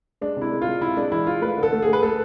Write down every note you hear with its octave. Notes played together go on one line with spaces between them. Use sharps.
G#3 D4
C3 E4
G#3
F4
G#3
C3 E4
G#3 D4
E3 E4
G#3 F4
A3 B4
D3
A4
A3
A3 G#4
B4
A3 A4